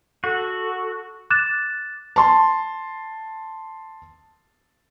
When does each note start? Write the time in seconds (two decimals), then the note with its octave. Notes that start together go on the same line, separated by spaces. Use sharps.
0.24 F#4 A4
1.30 D6 F#6 A6 E7
2.16 A5 C6